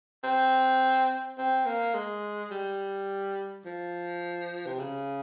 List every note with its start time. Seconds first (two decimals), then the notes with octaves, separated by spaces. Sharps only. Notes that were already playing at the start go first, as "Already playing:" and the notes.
0.24 C4
1.38 C4
1.66 A#3
1.94 G#3
2.51 G3
3.65 F3
4.66 C3
4.79 C#3